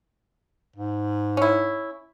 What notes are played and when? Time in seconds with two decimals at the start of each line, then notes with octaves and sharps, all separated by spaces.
0.76 G#2
1.37 C#4 E4